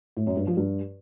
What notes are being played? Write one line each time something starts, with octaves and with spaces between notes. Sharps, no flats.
A2
F#2
G2
F3
G2